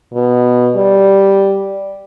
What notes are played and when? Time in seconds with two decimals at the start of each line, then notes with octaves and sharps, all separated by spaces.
0.14 B2
0.76 G3